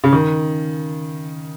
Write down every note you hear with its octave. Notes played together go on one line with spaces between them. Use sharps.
C#3
D#3